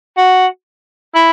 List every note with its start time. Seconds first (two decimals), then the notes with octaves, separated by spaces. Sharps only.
0.17 F#4
1.15 E4